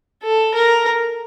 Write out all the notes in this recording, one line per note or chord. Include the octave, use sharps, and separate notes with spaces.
A4
A#4